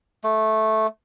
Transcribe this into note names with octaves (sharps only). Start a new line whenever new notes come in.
A3